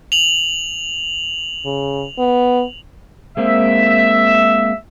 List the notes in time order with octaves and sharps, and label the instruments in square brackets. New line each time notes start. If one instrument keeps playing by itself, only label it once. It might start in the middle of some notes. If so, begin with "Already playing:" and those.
[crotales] F7 F#7
[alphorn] C#3
B3
[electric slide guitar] G#3 A#3 C4 [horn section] E5